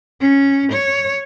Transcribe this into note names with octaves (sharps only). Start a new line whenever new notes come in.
C#4
C#5